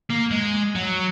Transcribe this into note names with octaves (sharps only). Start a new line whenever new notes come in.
A#3
G#3
F#3